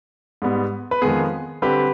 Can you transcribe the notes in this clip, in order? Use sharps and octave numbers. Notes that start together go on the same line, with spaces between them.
G#2 G3 B3
B4
F2 D#3 G#3 B3 G#4
D3 G3 C4 G4 B4